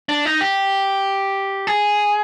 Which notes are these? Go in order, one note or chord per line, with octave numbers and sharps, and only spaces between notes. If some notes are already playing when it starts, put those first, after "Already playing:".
D4
D#4
G4
G#4